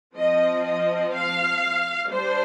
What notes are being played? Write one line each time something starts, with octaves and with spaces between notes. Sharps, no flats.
F3 C4 D#5
D#5
F5
G3 D4 C5